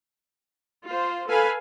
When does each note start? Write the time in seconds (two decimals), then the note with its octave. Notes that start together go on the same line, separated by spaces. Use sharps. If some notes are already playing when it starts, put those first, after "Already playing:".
0.84 F4 C5
1.27 A4 B4 F5 G#5